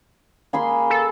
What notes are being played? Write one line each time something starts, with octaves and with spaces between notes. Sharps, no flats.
A#3 G#4 B5 C6
A4